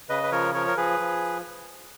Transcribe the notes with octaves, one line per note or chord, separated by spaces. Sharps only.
C#3 B4 D#5
B4
F3 A#4 C#5
F3 A#4 C#5
A#4
F3 G#4 B4
F3